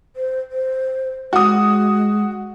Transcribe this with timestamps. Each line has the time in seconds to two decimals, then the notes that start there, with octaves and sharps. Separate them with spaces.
0.16 C5
0.51 C5
1.33 G#3 F#4 D#6